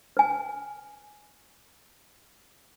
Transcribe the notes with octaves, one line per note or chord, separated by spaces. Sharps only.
B4 G#5